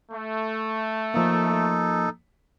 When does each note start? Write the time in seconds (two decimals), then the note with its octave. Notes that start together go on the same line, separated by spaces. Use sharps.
0.11 A3
1.14 F3 A#3 D#4 A4